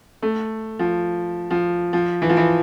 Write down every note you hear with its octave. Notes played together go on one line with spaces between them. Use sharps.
A3
F3
F3
F3
E3
F3
E3